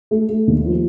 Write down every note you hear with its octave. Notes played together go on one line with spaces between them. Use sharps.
A3
A3
D#2
F3